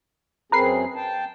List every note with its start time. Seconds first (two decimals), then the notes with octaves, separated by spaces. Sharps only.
0.52 F#2 C4 G#4 A#4 B4 C7
0.96 G5 A5